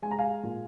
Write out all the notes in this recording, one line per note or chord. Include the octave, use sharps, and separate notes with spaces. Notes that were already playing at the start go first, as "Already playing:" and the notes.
G#3 G#5
A#5
F5 G#5
A#2